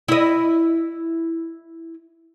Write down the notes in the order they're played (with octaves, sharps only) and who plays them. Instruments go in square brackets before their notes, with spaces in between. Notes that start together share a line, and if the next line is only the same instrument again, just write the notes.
[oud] E4 D#5